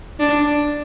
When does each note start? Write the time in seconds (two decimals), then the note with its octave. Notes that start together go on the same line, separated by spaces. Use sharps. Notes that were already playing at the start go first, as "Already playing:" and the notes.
0.19 D4